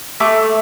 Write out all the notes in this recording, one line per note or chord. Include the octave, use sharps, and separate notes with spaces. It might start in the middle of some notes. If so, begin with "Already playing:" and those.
A3 D6